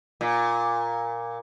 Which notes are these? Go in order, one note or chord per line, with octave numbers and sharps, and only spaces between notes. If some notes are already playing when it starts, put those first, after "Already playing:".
A#2